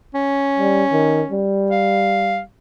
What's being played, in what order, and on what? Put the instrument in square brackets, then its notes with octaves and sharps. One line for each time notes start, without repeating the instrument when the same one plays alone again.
[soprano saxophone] C#4
[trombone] G3
D#3
G3
[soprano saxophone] F5